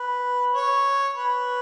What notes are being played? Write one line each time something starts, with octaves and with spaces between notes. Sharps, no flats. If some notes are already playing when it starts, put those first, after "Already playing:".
Already playing: B4
C#5
B4